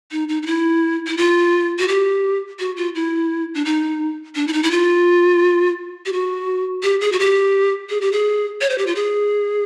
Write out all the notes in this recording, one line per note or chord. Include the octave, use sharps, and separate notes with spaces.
D#4
D#4
D#4
E4
E4
F4
F#4
G4
F#4
F4
E4
D4
D#4
D4
E4
D#4
E4
F4
G4
F#4
G4
G#4
F#4
G4
G#4
G4
G#4
C#5
C5
G4
F4
G#4